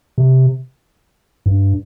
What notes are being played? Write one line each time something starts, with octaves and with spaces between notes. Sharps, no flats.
C3
G2